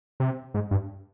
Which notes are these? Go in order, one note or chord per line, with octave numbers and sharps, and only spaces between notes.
C3
G#2
G2